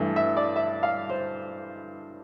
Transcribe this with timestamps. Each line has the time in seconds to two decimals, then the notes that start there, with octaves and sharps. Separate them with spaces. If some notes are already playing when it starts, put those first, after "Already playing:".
Already playing: G2 E3 A3
0.16 E5
0.37 D5
0.56 E5
0.83 F5
1.10 C5